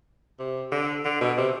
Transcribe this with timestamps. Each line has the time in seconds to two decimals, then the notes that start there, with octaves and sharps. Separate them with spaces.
0.39 C3
0.72 D3
1.05 D3
1.21 B2
1.37 C3